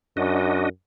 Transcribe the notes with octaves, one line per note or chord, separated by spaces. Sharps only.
F#2 D4 F#4 D#5